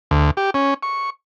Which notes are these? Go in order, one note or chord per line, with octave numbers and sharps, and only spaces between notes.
D2
G4
C#4
C#6